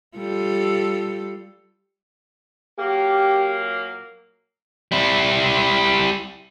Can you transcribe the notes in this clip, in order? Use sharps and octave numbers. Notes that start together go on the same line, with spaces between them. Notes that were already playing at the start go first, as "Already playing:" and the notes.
G3 F4 A4
A#2 F#3 A#3 G4
G3 E4